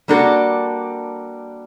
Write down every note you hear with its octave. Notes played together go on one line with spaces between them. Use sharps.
G3 A#3 D4 F#4 A4